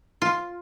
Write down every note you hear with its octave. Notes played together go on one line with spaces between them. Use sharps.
F4